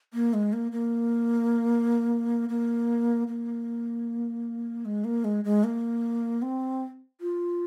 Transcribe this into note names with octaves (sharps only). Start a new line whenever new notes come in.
A#3
G#3
A#3
A#3
A#3
A#3
G#3
A#3
G#3
G#3
A#3
C4
F4